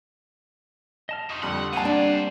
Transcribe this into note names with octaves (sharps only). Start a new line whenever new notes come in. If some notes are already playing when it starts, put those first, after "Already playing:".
D#5 A5 F6
F2 D#4 C6 C#6 D#6
F2 D3 G3 F#5
G3 A#3 C4 C5 F#5 G#5 A5
D4